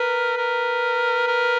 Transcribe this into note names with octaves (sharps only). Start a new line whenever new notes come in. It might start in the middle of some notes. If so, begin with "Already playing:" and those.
Already playing: A#4 B4
A#4
A#4